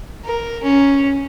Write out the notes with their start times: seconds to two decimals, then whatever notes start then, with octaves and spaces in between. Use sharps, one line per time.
0.25 A#4
0.63 C#4